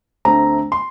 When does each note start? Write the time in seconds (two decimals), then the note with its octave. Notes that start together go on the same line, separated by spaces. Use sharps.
0.25 D2 D3 A3 C4 A#5
0.72 C6